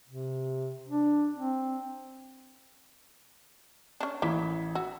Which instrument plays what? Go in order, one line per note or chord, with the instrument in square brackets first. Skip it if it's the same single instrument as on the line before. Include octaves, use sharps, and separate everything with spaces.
[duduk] C3
D4
C4
[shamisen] C#4 D4
[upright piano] A1 E4 B6 [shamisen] A#3
[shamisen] F#4 [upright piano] E6